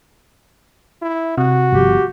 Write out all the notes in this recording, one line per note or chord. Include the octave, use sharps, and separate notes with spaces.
E4
C3 F#4
G1 F3 G4